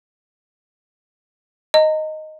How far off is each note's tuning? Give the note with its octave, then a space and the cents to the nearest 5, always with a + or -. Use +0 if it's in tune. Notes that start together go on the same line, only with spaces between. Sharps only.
D#5 +0 A#5 -35